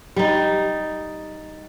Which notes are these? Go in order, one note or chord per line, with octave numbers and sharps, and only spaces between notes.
G3 D#4